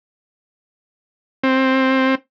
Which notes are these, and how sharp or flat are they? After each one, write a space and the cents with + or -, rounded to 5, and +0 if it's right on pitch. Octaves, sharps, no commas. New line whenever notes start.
C4 +10